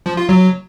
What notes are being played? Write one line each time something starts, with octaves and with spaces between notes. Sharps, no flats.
F3
F4
F#3